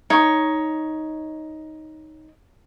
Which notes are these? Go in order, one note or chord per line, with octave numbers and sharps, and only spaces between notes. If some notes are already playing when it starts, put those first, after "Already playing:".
D#4 C#5